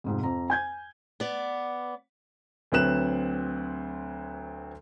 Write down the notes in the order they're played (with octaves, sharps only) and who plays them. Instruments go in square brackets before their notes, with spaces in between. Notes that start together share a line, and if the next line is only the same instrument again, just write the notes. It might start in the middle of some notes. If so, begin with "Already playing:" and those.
[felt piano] F2 G#2 C3
F2 A#5
G#5 G6 G#6
[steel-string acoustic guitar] B3 D5
[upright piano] D2 F#3 C4 B4 F#6 E7